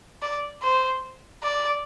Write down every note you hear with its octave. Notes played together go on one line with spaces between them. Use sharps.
D5
C5
D5